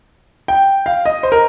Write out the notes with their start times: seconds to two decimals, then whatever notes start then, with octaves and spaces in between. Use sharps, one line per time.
0.48 G5
0.86 F5
1.05 D#5
1.23 C5
1.32 A#4